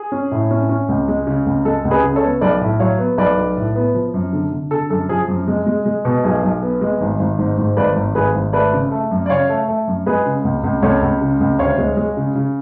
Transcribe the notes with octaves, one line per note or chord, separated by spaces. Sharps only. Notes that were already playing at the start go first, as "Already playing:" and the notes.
Already playing: G#4
C#4
A2
C#4
C#4
C#2
G#3
C#3
C#2
G#3 A4
C#2
G#4 B4
C#3
A4 C#5
B3
B1 B4 D5
A2
F#3 C#5 F5
B3
B1 B4 D5
B1
A2
B3
F3
F#2
D3
D3
D3 A4
F#2 A4
F3 G#4
F#2
G#3
G#3
G#3
B2
B1 G#4
B1
B3
G#3
G#1
G#1
G#2
G#2
G#1 B4 D5
G#1
G#1 G#4 B4
G#1
A3 B4 D5
C#3
A3
F#2
D5
C#3 C#5 F5
A3
A3
F#2
G#3 G#4 B4
C#3
C#2
C#2
C#2 A4 C#5
C#2
C#3
C#2
D2 C#5 F5
G#3
G#3
C#3
C#3